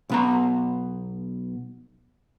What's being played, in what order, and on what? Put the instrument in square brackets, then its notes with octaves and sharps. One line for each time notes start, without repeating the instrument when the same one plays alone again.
[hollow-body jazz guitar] B1 B3 A#5